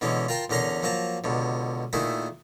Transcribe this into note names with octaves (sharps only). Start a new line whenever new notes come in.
B2 D3 E3 G#3 C#4
F4 A#4 G5 A5 A#5 C6
E2 D3 C#4 A#4 A#5 C6
F3 F#3 A#3 A5 A#5
C#2 B2 D3
A#2 D#3 A3 E4 G#4